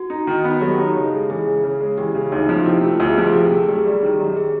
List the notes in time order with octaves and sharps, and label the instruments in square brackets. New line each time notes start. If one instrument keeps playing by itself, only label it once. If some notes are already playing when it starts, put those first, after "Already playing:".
Already playing: [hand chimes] F#4
[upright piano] D#4
D#3
B3
[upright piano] F#3 [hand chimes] G4 A4
[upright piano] D#4
C#3
G#3
[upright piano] E3 [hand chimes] G#4
[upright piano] C#3
C#3
G#3
[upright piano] E3 [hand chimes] G4
[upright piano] C#3
[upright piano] D2 [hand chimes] D#4
[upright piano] F3
[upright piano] C3 [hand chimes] E4
[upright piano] A3 [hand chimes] F4
[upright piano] D2 [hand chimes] G4
[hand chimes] G#4
[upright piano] F3
[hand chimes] G#4
[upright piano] C3
A3
[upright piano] F#2 [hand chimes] G4
[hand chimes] G#4
[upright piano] G3 [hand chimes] G4
[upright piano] D#3
F#2
[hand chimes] G#4